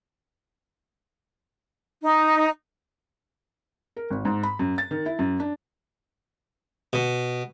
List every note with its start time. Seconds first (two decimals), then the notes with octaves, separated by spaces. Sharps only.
2.02 D#4
3.97 A#4
4.11 G#1
4.25 G#2
4.43 B5
4.59 F#2
4.78 A6
4.91 D#3
5.06 E4
5.19 F#2
5.40 D4
6.93 B2